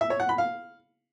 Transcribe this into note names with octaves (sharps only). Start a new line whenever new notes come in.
E5
C#5
F#5
B5
F5